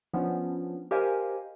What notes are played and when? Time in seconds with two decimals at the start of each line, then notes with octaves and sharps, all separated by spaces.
0.14 F3 B3 C#4 D4
0.91 G4 A#4 C5 D#5 F5 G#5